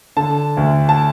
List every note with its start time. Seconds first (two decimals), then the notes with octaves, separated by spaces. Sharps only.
0.17 D3 A5
0.57 D2
0.89 A5